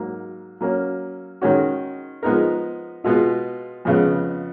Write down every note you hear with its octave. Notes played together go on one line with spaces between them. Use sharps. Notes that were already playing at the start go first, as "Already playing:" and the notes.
Already playing: G#2 F#3 A#3
F#3 A#3 C#4
D#3 G#3 C#4 F#4
F3 G#3 B3 D#4 A#4
B2 G#3 B3 F4
F2 C#3 G#3 B3